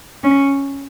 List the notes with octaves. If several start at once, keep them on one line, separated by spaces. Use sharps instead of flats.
C#4